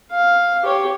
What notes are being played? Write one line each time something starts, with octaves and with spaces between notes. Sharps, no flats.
F5
G4 C#5